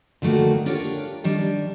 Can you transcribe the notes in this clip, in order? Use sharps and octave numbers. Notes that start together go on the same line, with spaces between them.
D3 D#3 A3 A#3 F#4
D4 F4 G4 A#4 C#5
D#3 G3 D4